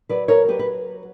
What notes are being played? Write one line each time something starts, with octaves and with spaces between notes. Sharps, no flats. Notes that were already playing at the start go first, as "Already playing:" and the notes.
F#3 B4 D5
A#4 C#5
F#3 G4 B4
B4